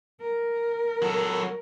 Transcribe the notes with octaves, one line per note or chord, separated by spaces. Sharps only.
A#4
F#3 A4